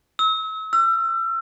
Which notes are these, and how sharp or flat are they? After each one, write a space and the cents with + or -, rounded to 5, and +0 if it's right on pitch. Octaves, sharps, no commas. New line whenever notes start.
E6 -35
E6 +40